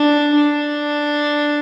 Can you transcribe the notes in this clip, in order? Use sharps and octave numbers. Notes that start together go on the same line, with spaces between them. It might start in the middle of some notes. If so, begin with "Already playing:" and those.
Already playing: D4
D4